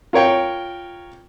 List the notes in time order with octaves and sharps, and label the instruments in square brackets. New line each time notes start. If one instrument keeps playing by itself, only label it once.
[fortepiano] F4 A#4 C#5 G5